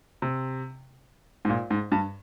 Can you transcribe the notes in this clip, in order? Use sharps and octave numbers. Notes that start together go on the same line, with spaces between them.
C3
G#2
A#2
G#2
G2